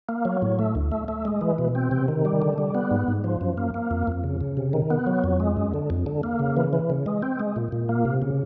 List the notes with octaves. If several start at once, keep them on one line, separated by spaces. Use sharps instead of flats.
A#3
F#3
A2
A3
D2
A3
A3
G#3
E3
B2
C4
C3
D#3
G3
D3
G3
B3
G#2
G#2
F3
F#2
A#3
A#3
F2
F2
C#3
C#3
C3
D#3
B3
F#3
F2
G#3
F#2
D3
F2
D3
A#3
C#3
E3
E3
C#3
G#3
C4
G#3
A#2
A#2
A#3
C3
C#3